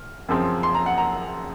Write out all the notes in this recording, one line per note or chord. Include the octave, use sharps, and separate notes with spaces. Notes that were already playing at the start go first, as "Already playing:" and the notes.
Already playing: F6
F#2 C#3 F3 C4
C6
A#5
F#5
A#5